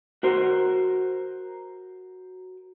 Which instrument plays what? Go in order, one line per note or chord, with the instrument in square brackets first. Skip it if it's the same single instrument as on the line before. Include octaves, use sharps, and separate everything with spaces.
[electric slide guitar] F#4 A#4 C5